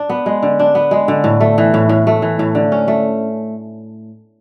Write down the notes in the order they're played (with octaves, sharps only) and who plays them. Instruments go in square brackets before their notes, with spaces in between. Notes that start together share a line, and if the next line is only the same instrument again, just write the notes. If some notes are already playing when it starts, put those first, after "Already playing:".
Already playing: [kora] D4
B3
G#3
D3
D4
B3
G#3
D3
A2
A3
E3
A2
A2
A3
E3
A2
D3
C#4
A3